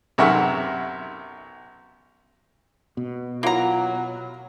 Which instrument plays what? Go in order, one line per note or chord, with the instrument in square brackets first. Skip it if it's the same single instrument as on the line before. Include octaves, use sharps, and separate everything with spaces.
[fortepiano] B1 F#2 C3 E5 F#5 C#6
[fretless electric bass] B2
[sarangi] F#3 [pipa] A#3 A#5 [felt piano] E4 F4 F#5